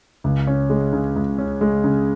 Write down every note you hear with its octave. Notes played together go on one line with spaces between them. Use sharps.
C#2
C#4
G#3
C#3
C#2
C#4
G#3
C#3